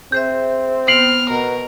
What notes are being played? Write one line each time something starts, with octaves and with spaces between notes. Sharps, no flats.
C4 G#4 C5 E5 G6
B3 F6 C7 F#7
B2 A#4